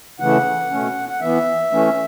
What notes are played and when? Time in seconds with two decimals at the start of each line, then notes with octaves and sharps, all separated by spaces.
0.20 C#3 E3 A3 F#5
0.70 B2 A3 C#4
1.09 F#5
1.21 E3 B3 E5
1.71 E3 A3 C#4